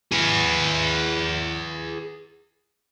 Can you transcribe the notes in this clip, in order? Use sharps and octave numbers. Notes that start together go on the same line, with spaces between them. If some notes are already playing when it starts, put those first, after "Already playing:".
G#4 B4